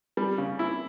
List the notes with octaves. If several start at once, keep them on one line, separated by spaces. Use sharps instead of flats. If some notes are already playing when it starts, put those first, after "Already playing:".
G3
C#3
E4